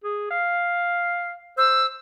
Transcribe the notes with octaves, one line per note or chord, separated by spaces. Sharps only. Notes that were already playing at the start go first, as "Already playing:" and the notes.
G#4
F5
C5 E6